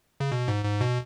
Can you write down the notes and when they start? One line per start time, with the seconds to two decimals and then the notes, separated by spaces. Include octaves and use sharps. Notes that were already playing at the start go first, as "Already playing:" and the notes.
0.20 C#3
0.32 B2
0.48 G#2
0.65 G#2
0.81 B2